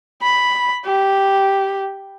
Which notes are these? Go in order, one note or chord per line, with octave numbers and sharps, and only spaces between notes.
B5
G4